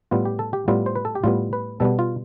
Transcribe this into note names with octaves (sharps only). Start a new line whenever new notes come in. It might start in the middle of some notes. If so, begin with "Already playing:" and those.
A2 G3 B3 F4
G4
A4
G4
A2 G3 B3 F4
C5
B4
A4
G4
A2 G3 B3 F4
B4
B2 G3 B3 A4
F4